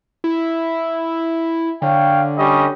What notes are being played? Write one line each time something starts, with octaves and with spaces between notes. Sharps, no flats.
E4
D3 C#5 F5 G5
G3 C#4 D#5